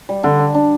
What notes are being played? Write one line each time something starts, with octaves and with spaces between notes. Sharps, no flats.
G3
D3 D4
D4
D4